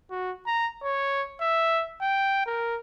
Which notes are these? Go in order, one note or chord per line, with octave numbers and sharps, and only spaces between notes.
F#4
A#5
C#5
E5
G5
A#4